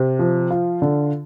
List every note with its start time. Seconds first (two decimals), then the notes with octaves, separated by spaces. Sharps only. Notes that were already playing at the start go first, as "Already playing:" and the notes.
Already playing: C3
0.19 F3
0.51 F4
0.82 D3